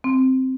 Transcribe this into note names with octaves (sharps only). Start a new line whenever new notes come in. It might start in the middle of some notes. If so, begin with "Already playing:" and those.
C4